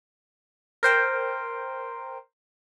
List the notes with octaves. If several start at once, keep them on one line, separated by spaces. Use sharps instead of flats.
A#4 C5 G5